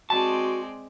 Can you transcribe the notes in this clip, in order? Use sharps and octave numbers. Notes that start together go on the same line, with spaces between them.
G#3 C4 F#4 D5 A5